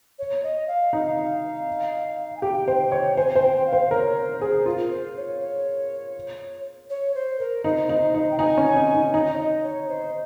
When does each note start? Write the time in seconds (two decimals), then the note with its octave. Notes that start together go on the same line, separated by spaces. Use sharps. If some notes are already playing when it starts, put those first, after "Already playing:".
0.19 C#5
0.44 D#5
0.68 F5
0.93 D#4
2.37 G#5
2.42 G4 G5
2.68 C5
2.92 C#5
3.17 C5 G#5
3.36 C5 G#5
3.42 G5
3.56 G5
3.66 F5
3.73 C5
3.91 A#4 C#5
4.16 C5
4.41 G#4 C5
4.66 F4 A#4
4.91 C5
5.16 C#5
5.41 C#5
6.90 C#5
7.15 C5
7.39 A#4
7.64 D#4 C5
7.89 D#4
8.15 D#4
8.31 G5
8.39 D#4 G#5
8.58 C#4
8.76 D#4
8.95 D#4
9.13 D#4 D#5
9.33 C#5
9.39 D#5
9.63 C#5
9.88 C5